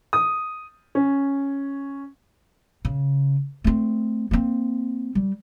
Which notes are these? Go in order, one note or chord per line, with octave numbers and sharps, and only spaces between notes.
D#6
C#4
C#3
A3 C4
A#3 C4
G3